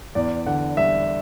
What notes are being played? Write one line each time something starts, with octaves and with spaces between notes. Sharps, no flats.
E2 D5
D3 F#5
G3 E5